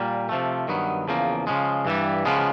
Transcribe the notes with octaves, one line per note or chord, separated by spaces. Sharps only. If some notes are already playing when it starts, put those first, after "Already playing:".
Already playing: A#2 G3 A#3
C3 F3 A3
G2 D#3 F#3 B3
E2 C#3 F3 A#3
C#3 F3 G#3
G2 E3 G3
C#3 F3 G#3 B3